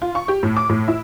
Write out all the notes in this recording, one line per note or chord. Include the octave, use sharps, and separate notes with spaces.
F4
C#6
G4
A2
D6
A2
E4